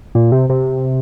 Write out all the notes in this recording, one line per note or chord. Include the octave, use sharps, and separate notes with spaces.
A#2
C3
C3